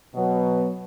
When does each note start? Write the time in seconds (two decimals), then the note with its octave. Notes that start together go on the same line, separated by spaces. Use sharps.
0.15 B2 F#3 B3